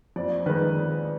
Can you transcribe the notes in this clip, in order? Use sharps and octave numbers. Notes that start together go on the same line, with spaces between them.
F2 D5
D#3 G#3 B4